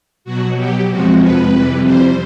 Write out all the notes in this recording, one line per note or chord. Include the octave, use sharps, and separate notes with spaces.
B2 F#3 F#4
G4
F2 C3 F3 G#3 F#4
B4
F2 C3 E3 G3
C5